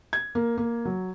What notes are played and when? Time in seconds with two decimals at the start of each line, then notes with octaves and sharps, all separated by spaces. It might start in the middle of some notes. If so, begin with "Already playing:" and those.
0.13 G#6
0.35 A#3
0.57 A#3
0.85 F#3